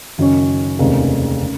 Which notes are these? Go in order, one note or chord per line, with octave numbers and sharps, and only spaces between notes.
F#1 F#2 D#3 F#3 C#4
F1 D#2 C#3 G#3 C4
C#3